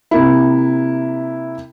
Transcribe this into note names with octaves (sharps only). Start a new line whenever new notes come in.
C3 A#3 E4